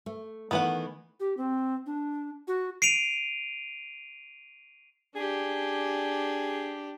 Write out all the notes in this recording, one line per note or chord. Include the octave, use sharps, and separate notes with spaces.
A3
D#3 E3 A3 B3 B4 F#5
G4
C4
D4
F#4
C7 D7 D#7 F7
D4 G4 G#4